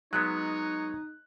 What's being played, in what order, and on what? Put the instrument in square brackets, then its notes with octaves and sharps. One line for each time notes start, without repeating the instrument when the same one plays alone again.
[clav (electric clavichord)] F#3 G#3 B3 [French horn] D#4 [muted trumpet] C#5 [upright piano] F#6